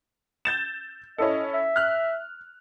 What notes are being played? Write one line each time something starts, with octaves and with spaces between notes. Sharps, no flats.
G6 A6 E7
C#4 E4 A4 D#5
E5
F6 F#6